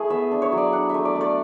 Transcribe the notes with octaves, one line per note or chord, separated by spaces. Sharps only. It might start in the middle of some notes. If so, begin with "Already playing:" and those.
Already playing: A3 E4 G#4
B3 E5
D4
C#5
F#3
D5
D4 F#5
A3 E5
D5
A3
D5